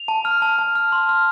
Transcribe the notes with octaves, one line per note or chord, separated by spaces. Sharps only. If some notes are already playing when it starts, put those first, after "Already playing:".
Already playing: F7
A5
F6
A5
A5
F6
C6
F6